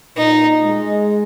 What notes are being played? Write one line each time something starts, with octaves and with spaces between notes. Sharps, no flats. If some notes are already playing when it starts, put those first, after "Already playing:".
A#2 D#4
G#3